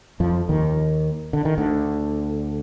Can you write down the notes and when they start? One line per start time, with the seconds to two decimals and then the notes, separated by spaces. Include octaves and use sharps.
0.20 F2 F3
0.49 D#2 D#3
1.33 D3
1.45 D#3
1.58 D2 D3